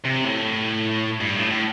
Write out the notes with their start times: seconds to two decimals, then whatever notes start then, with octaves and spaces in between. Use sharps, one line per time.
0.05 C3
0.25 A2
1.21 G2
1.36 A2
1.51 A2